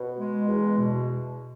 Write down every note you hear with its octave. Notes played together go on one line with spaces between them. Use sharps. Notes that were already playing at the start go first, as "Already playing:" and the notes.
Already playing: B2
G#3
E2
B2